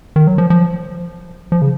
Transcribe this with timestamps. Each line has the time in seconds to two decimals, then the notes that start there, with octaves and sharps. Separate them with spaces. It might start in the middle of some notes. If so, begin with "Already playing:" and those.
0.16 D#3
0.27 F#3
0.38 F3
0.50 F3
1.52 F3
1.62 C#3